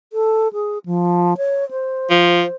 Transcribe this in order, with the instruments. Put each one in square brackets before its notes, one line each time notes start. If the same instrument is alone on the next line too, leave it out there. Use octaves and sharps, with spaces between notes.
[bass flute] A4
G#4
F3
C#5
C5
[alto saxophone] F3